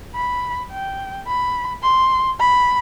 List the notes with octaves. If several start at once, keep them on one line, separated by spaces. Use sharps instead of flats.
B5
G5
B5
C6
B5